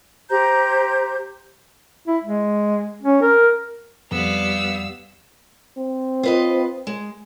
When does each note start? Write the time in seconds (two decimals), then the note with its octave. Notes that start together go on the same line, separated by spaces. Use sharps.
0.30 G4 C5 A#5 G6
2.08 E4
2.24 G#3
3.03 C#4
3.22 A#4
4.12 F2 G3 B3 F5 E6
5.78 C4
6.23 F4 B4 D#5
6.87 G#3